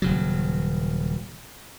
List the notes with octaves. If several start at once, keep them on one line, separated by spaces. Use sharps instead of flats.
D#1 C#3 F#3